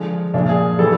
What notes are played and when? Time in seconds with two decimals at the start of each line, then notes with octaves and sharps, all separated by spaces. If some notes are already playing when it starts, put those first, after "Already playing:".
Already playing: D3 F3 G#3
0.34 A#2 F3 G#3 D4
0.49 G#4
0.79 A2 E3 G3 A4